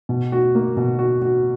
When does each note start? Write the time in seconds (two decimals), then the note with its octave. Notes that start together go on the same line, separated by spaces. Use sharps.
0.09 B2
0.32 F#4
0.55 A#3
0.77 B2
0.99 F#4
1.22 F#4